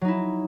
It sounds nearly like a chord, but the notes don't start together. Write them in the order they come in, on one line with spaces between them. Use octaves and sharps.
F#3 D#4 E4